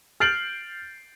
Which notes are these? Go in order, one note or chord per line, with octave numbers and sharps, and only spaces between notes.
F6 G6 A6 C7 D7 F#7